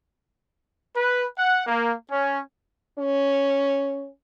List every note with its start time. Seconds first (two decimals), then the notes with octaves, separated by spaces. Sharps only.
0.96 B4
1.38 F#5
1.67 A#3
2.11 C#4
2.99 C#4